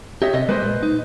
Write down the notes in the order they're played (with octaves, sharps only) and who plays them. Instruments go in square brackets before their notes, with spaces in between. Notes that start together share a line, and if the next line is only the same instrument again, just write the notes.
[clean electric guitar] G4 [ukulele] C#5 D#5 E5
[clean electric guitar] C3 [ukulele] D#5
[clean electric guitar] G3 G#3 A#3 [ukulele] B4 C5 D#5
[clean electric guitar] A#2
D#4